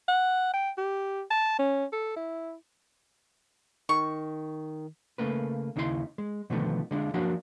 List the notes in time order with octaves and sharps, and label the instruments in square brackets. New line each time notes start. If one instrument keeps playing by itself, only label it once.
[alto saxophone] F#5
G5
G4
A5
C#4
A4
E4
[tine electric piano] D#3 [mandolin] C#6
[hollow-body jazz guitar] C#3 A3 A#3 B4
D#2 C#3 D#4 E4 B4 C6
G#3
B2 D3 D#3 F3 A3 B3
D3 G#3 D4 F4
F3 F#3 A#3 D4 F#4